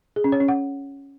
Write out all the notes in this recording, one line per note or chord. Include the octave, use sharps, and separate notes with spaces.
G#4
C#4
C#5
C#4
F#5